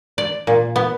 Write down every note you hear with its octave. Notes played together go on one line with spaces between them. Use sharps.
D5
A#2
B3